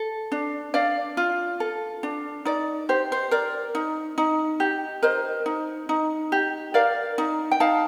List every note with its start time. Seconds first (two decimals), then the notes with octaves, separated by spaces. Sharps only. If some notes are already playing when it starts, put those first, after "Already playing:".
Already playing: A4
0.32 D4
0.74 D4 D5 F5
1.17 F4
1.60 A4
2.03 D4
2.45 D#4 D5
2.89 G4 C5
3.12 C5
3.31 A#4 D5
3.75 D#4
4.18 D#4
4.60 G4
5.03 A#4 C5 D#5
5.46 D#4
5.89 D#4
6.32 G4
6.74 A#4 D5 F5
7.18 D#4
7.51 G5
7.60 D#4 F5 A5